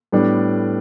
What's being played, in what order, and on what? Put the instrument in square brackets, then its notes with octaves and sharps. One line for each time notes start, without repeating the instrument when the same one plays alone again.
[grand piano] A2 G3 B3 D4